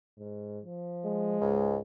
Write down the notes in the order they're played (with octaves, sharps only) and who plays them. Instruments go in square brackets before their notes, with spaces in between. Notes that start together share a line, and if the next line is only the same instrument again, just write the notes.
[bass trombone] G#2
F3
[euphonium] G#3
[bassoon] C#2 [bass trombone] G#2